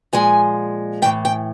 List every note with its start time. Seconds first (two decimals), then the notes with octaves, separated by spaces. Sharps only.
0.13 A#2 F3 G#3 G#5
1.02 A2 E3 A3 G5
1.25 G5